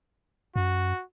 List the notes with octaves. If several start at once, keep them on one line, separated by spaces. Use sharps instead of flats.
F#2 F#4